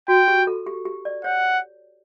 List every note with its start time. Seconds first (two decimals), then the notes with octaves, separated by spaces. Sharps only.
0.08 F#4 G5
0.28 G4
0.47 A4
0.67 G4
0.85 G4
1.05 D5
1.24 C#5 F#5